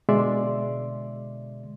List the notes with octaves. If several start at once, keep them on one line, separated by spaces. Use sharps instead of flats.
B2 D3 G#3 D5 E5 C6